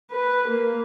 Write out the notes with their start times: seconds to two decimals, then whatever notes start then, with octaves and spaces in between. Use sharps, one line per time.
0.11 B4
0.48 A#3